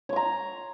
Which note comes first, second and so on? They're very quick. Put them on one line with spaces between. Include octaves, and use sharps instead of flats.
C#5 C6 A#5